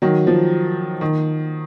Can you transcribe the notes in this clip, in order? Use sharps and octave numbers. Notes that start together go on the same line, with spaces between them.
D#3 F#3
F3
D#3